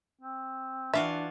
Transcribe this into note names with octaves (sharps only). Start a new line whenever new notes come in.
C4
E3 D4 F4 F#4 E5